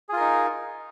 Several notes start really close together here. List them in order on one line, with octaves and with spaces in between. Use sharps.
G#4 F4 A#4 D#4